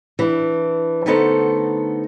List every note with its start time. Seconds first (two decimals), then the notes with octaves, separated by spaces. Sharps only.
0.19 E3 D4
1.06 D3 A3 B3 D#4 A4 C5